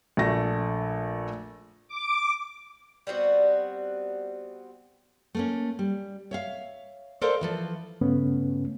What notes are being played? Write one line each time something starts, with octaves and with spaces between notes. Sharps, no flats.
A#1 A3 A#6
D6
G3 B3 C4 F#4
A3 A#3 C#4
G3
C#5 E5 F5
A4 A#4 C5 D5 D#5 F5
E3 F3 A4
G2 C#3 A3 B3 C#4